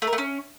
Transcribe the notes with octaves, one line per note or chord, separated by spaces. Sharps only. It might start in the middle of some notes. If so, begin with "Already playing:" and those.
A3
A#4
A3
C#4